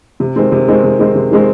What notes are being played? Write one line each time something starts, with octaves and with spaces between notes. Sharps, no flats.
C3
D#3 G#3 C4
C3
D#3 G#3 C4
C3
D#3 G#3 C4
C3
D#3 G#3 C4